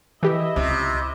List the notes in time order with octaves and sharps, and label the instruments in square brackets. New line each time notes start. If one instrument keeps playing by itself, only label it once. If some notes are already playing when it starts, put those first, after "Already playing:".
[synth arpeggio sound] E3 G4 [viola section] E4 D#5 E5
[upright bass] C#2 [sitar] C3